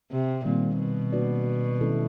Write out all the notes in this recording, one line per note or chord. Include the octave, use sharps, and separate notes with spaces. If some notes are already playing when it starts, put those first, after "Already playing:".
C3
A#2 D#3 G3 C4
B2
A#3 D4 F#4 B4 D5
D#3 G#3 C#4 E4 A4